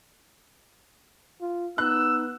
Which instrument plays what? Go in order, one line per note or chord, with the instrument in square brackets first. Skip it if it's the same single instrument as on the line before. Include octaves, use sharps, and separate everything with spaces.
[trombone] F4
[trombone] B3 [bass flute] D#4 [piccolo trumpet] E6 [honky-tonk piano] F#6